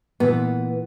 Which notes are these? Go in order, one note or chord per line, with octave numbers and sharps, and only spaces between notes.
A#2 E3 B3